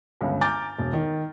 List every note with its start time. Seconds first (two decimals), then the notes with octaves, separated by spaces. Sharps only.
0.21 G1 C#2
0.41 G#5 A#5 D6 F6 G6 A6
0.78 E1
0.93 D#3